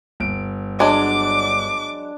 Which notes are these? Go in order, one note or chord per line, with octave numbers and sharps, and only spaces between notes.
G1 D7
F#3 G#3 D4 D6